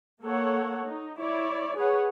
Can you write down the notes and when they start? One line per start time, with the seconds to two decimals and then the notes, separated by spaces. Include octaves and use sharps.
0.23 A#3 A4 C#5 F#5
0.86 D#4
1.19 E4 C#5 D5
1.75 G#4 B4 C#5 F#5